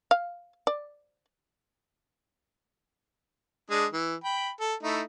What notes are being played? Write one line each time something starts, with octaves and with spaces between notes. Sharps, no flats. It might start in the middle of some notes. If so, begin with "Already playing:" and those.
F5
D5
G#3 D4 D#6
E3
G5 B5
A4
A3 D#4 E4